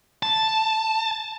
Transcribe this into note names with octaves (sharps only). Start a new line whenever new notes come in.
A5